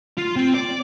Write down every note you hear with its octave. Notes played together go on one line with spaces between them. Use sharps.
F4
C4
D5